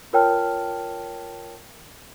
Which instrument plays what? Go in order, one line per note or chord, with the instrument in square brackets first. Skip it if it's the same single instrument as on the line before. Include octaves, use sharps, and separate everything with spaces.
[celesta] F4 A#4 C#5 G5 A5 F6